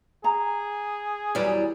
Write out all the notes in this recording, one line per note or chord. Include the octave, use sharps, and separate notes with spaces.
G#4 A#5
E2 F#3 G3